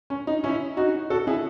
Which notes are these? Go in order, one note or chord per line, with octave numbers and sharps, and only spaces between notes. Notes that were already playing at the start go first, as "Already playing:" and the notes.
C#4
D#4
C#4 E4
D#4 F#4
F#4 A4
E4 G#4